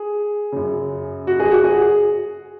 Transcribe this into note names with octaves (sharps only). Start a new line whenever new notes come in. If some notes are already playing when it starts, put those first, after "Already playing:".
Already playing: G#4
F#2 C#3
F#4
G#4
F#4
G#4